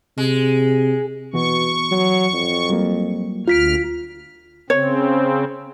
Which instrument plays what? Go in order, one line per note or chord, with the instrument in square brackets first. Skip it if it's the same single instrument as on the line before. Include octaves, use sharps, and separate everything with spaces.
[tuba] C3 [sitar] G#3
[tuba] B2 [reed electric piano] E3 F#4 [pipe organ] C#6
[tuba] F#3
F2
[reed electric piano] F#3 G3 A#3
[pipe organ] D2 F6 [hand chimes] F4 B6 D7
[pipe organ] C#3 C4 [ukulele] C#5